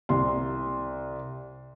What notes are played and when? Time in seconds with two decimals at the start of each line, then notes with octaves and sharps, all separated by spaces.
0.09 C2 C6